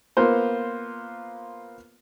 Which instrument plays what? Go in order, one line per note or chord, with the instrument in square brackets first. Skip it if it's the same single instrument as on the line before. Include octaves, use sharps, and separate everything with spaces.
[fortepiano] A#3 B3 F4 C5